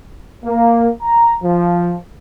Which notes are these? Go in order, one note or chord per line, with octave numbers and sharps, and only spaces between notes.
A#3
A#5
F3